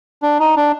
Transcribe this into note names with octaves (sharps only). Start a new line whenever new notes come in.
D4
D#4
D4